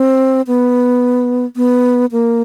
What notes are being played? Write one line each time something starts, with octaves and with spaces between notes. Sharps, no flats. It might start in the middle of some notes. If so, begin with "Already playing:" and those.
Already playing: C4
B3
B3
A#3